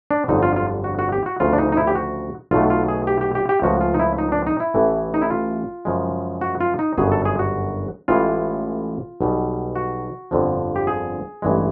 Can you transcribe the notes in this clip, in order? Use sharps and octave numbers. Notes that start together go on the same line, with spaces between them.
D4
G1 F2 D3 F#3 D#4
F4
F4
F#4
F#4
G4
F#4
D2 C#3 F3 F4
D4
D#4
D#4
E4
G4
F#4
B1 B2 F#3 A3 F4
F4
G#4
G4
G4
G4
G4
C#2 C#3 F3 A3 F#4
F4
D#4
E4
D#4
D4
D#4
E4
A1 A2 E3 A3
D#4
E4
F4
F#2 C#3 F3 G#3
F#4
F4
D#4
G1 F#2 C#3 F#3 G#4
A4
G#4
F#4
A1 A2 E3 G#3 F4
B1 B2 G3
F#4
G1 F2 D3 F3
G4
G#4
A1 G2 E3 G#3